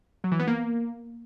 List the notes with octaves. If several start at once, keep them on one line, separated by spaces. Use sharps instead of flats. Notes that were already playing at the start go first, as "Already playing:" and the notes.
F#3
E3
B3
A#3